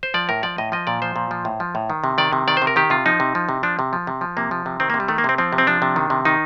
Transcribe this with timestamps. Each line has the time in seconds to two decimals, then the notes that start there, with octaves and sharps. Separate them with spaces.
0.03 C5
0.14 F3 D5
0.29 A2 A#4
0.43 F3 D5
0.58 A2 D#5
0.72 F3 D#5
0.87 A#2 D5
1.02 F3 C5
1.16 A#2
1.31 F3
1.45 A2
1.60 F3
1.75 A2
1.90 D#3
2.04 C3
2.18 D#3 D5
2.33 C3
2.48 D#3 D5
2.57 C5
2.62 C3
2.67 A#4
2.76 D#3 G4
2.90 C3 F4
3.06 F3 D#4
3.20 C3
3.35 F3
3.49 C3
3.63 F3 D4
3.79 C3
3.93 F3
4.07 C3
4.21 F3
4.37 C3 A#3
4.51 F3
4.66 C3
4.80 D#3 C4
4.90 A#3
4.94 C3
5.00 G3
5.08 D#3 A3
5.18 A#3
5.24 C3 C4
5.38 F3 C4
5.53 C3
5.58 C4
5.67 F3 D4
5.82 C3
5.96 D#3
6.10 C3
6.25 D#3 D#4